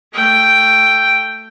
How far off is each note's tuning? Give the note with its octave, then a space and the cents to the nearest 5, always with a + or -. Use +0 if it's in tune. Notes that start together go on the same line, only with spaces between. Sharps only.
A3 +10 G5 +0